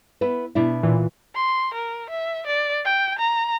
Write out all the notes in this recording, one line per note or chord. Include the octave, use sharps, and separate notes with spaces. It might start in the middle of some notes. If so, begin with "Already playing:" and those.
B3 E4 B4
B2 D4 E4
A#2 E3
C6
A#4
E5
D5
G5
A#5